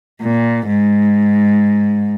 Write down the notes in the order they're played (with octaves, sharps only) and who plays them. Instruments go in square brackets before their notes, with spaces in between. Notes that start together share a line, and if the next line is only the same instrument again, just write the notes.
[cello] A#2
G#2